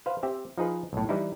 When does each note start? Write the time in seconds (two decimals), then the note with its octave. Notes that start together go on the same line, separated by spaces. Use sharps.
0.06 B4 C5 F5
0.23 C4 G4 E5
0.58 F3 D#4 G#4 B4
0.93 B1 A2
1.09 E3 G3 D#4 E4